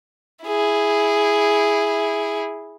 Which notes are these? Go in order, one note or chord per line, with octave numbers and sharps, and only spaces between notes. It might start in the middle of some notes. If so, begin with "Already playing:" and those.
E4 G#4